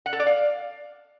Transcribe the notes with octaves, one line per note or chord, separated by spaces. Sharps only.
F#5
A4
D5
F5